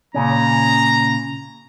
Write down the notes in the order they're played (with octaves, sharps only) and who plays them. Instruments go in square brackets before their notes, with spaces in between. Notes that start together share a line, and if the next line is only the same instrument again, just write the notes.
[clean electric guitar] A#2 C#3 C#4 [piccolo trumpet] A#5